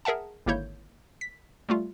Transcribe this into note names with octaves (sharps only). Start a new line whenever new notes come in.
G#4 A#4 E5 F#5 A5
G#1 D3 A#3 E4 C#5 G6
B6
G3 A3 F4